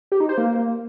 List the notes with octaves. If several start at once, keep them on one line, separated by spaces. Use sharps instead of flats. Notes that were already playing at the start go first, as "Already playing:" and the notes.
G4
D#4
C5
A#3